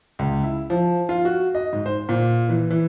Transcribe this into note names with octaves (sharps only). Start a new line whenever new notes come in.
C#2
E4
F3
F4
F#4
D#5
G#2
C5
A#2
E3
E3